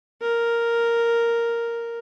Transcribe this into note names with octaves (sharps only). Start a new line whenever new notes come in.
A#4